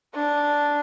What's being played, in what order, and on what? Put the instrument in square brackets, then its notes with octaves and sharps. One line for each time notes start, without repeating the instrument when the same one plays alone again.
[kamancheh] D4